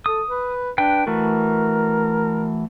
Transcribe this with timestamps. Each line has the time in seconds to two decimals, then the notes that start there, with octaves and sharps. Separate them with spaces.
0.06 A4 D#6
0.28 B4
0.78 D4 B4 G5
1.07 E3 A3 F#4 A#4